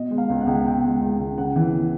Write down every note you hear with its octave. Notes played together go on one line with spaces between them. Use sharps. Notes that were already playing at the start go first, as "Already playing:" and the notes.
Already playing: B2 D#5
G#3
F5
C#2
F#5
C#2
B2 G5
G#3
C#2
C#2
C#3 F#5
E3